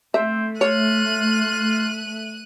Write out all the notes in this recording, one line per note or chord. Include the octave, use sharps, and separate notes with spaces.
A3 C4 E5
F4 C#5 F#6 D#7